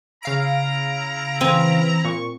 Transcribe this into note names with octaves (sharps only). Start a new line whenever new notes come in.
C#3 E4 F5 A#5 D7
E3 C4 G#5
A#2 C#6